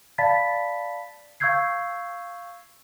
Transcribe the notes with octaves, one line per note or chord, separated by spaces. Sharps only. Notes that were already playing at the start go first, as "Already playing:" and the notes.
D5 F5 A5 B5 A6 B6
F5 C#6 E6 G6 G#6 C7